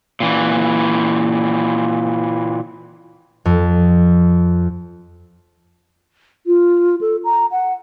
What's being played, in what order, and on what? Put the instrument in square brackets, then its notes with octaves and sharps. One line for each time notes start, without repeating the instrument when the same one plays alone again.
[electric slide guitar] A#2 E3
[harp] F2
[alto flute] F4
A4
A#5
F#5